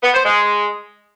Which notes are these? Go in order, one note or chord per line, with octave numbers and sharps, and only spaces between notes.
B3
C5
G#3